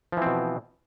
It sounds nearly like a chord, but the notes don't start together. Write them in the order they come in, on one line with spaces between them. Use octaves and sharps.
F3 E3 C4 B2